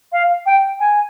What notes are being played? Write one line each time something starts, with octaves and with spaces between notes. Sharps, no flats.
F5
G5
G#5